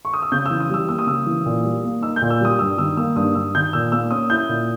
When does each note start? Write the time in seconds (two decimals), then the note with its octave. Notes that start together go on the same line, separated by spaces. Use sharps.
0.05 C#6
0.14 D#6
0.22 E6
0.32 C#3 G6
0.46 E3 E6
0.60 D#6
0.69 G3 E6
0.89 A#3 E6
0.99 D#6
1.07 C#3 E6
1.26 E3
1.46 A#2
1.64 G3
1.84 A#3
2.02 D#4 E6
2.16 G6
2.22 A#2
2.30 E6
2.40 G3 D#6
2.59 G2 E6
2.78 D#3 E6
2.97 A#3 E6
3.16 G2 D#6
3.35 G2 E6
3.55 D#3 G6
3.73 A#2 E6
3.92 A#3 E6
4.11 C#4 D#6
4.30 E4 G6
4.49 A#2